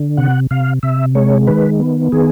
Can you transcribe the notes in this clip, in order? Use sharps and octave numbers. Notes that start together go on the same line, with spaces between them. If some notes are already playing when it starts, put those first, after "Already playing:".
Already playing: D3
C3 F#5
C3 F5
C3 E5
G#3 C#5
D#3 B4
B3
D#3 G#4